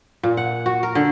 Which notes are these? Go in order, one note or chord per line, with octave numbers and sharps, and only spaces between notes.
A#2
F#5
F#4
A#4
D3